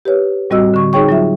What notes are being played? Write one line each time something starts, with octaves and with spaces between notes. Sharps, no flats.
G4 B4 C#5
A2 G3 C4 F#4 D#5 E6
D3 C#6
D#4 G#4 C#5 G5 C#6
F#3 F4 E5